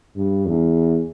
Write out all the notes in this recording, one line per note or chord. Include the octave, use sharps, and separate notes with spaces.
G2
E2